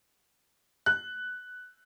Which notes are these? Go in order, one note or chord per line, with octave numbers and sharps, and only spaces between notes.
F#6